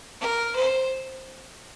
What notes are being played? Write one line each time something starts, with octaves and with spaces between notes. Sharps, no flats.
A#4
C5